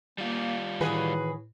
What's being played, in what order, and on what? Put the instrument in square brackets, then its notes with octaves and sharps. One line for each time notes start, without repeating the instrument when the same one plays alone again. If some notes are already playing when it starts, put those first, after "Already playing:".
[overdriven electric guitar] G3 F4 [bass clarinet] A#3
[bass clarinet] A2 [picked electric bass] D#3 E3 [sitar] F#4 G#4 B4